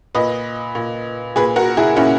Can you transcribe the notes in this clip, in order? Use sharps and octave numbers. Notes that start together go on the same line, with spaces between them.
A#2 B4 D#5
A#2
A#2 G#4 B4
F#4 A#4
E4 G#4
A#2 C#4 E4